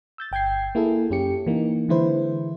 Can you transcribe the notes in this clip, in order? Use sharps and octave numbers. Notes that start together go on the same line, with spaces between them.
E6 G6 A6
G1 G5 G6 G#6 C7
A#3 E4 G#4 A4
F#2 C#4 G4 C#7
E3 A#3 D#4
D3 E3 G#3 E4 B4 C5